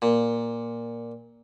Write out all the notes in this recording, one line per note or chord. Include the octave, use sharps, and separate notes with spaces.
A#2